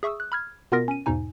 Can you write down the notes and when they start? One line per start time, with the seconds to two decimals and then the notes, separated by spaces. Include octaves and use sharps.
0.03 G#4 E5 C#6 D#6 E6
0.20 F#6
0.32 B5 F6 G#6
0.72 B2 B3 F4 A#4 A#6
0.88 C#4 D#7
1.06 E2 G#2 B2 D#4 G#5